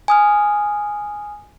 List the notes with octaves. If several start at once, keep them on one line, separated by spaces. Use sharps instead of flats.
G#5 D#6 F6